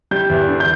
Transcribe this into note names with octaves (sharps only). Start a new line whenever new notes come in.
G3 G6
E2
D3
G6